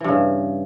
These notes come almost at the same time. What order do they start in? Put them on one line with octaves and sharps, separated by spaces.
E3 G2 C#3